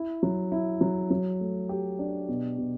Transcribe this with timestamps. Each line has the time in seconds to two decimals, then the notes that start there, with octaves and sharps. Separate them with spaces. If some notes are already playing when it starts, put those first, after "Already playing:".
Already playing: E4
0.23 F#3
0.52 E4
0.81 F#3
1.11 F#3
1.41 A3
1.69 G4
1.99 D4
2.29 B2
2.58 B2